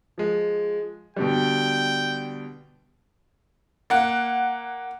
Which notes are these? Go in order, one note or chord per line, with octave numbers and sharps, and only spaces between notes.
F3 G#3
B2 D3 G3 G5
A#3 F#5